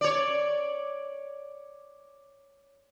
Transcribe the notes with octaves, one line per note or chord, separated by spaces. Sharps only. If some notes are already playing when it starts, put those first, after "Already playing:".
C#5 D5